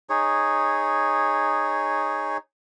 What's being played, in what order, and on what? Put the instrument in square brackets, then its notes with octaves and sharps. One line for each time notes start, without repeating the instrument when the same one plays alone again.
[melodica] D#4 G#4 C#5